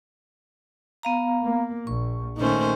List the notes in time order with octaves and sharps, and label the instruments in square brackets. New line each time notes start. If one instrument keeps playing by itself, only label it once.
[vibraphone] B3 F5 A#5
[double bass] A#3
[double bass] A#1 [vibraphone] C#6
[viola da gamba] A#2 A3 C5 [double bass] D#3 C#4